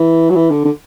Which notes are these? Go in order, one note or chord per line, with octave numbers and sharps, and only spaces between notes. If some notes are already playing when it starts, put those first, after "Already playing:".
Already playing: E3
F#3
E3
D3
D3